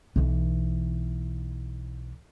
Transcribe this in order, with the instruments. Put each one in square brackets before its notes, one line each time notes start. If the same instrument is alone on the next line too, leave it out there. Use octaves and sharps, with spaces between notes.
[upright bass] B1 E3